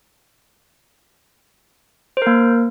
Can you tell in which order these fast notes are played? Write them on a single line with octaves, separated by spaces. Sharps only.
C5 A#4 A#3